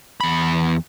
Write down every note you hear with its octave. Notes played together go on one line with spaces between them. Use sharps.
E2 B5